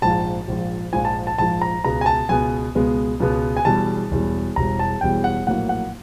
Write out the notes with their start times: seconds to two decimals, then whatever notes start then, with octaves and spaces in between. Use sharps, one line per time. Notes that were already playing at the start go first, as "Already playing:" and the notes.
0.02 A#1 G#2 F3 A5
0.48 A#1 G#2 F3
0.93 A#1 G#2 F3 G#5
1.05 A5
1.27 A5
1.38 A#1 G#2 F3 A5
1.62 A#5
1.84 C#2 B2 G#3 B3 A#5
2.01 G#5
2.06 A5
2.29 C#2 B2 G#3 B3 G#5
2.75 C#2 B2 G#3 B3
3.20 C#2 B2 G#3 B3
3.57 G#5
3.65 E1 E2 B2 G3 A5
4.11 E1 E2 B2 G3
4.56 E1 E2 B2 G3 A#5
4.79 A5
5.01 E1 E2 B2 G3 G5
5.24 F#5
5.47 A#1 A2 F#3 A#3 F#5
5.69 F#5